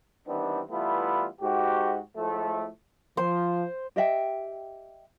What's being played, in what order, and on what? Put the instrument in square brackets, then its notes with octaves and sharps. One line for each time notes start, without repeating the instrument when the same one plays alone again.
[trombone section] D#3 E3 G3 B3 C4 D4
E3 G3 A3 B3 E4 F4
G#2 F#4 G4
A2 F3 G#3 A3
[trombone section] F3 [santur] C5 C6
[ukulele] G4 D#5 E5 G5